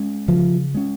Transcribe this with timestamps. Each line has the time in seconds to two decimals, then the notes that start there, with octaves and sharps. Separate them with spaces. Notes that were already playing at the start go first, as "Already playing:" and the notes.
Already playing: G#3 C#4
0.28 C#3 F3
0.74 G#3 C#4